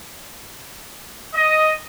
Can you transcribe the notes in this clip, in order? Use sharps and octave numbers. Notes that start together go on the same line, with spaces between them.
D#5